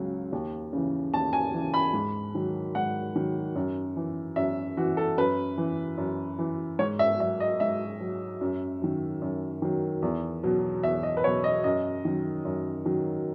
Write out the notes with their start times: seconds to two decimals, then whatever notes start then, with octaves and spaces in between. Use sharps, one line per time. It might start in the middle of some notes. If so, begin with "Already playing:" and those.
Already playing: C#2 C#3 F#3
0.32 D#2
0.73 C#3 E3
1.13 D#2 A5
1.33 G#5
1.54 C#3 E3
1.74 B5
1.94 G#2
2.35 D#3 F#3
2.75 G#2 F#5
3.15 D#3 F#3
3.56 F#2
3.97 E3
4.36 F#2 E5
4.77 E3 F#4
4.97 A4
5.17 F#2 B4
5.58 E3
5.98 F#2
6.39 E3
6.79 G#2 C#5
6.99 E5
7.20 F#3 E5
7.40 D#5
7.60 G#2 E5
8.01 F#3
8.41 F#2
8.82 D#3 F#3
9.22 F#2
9.62 D#3 F#3
10.02 E2
10.43 B2 F#3
10.83 E2 E5
11.03 D#5
11.17 B4
11.24 B2 F#3 C#5
11.44 D#5
11.64 F#2 D#5
12.05 D#3 F#3
12.45 F#2
12.85 D#3 F#3